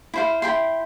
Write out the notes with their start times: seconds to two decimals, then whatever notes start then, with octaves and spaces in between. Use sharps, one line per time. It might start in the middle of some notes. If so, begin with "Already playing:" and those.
0.14 E4 C5 F5
0.42 E4 G5 C6